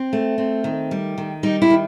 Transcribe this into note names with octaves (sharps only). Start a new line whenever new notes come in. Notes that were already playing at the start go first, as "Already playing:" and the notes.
Already playing: C4
A3
C4
D#3
G3
D#3
G3 D#4
E4
D#3